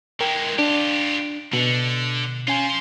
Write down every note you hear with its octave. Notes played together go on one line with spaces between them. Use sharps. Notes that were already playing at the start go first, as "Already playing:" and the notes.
E3 G#3 A#4 G5
D4 F4 G4
B2 D3
C#4 F4 C5 G#5